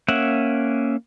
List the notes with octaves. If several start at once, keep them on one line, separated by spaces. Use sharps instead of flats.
A#3 C#4 E5 F#5